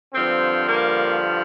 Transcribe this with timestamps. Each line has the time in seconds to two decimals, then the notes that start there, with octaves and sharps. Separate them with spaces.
0.14 G2 D3 F3 C4
0.69 A#3